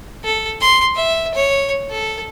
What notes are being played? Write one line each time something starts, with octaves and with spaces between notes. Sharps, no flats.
A4
C6
E5
C#5
A4